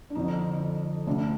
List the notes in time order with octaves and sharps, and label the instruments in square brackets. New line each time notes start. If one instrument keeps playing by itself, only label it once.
[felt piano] D4
F2 D3 D#4
D2 D3 D4